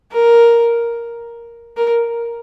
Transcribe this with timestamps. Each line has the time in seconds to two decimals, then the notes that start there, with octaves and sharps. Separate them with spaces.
0.12 A#4
1.77 A#4